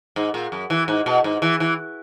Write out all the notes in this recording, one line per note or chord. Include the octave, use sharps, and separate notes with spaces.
G#2
A#2
F#2
E3
G#2
B2
G#2
E3
E3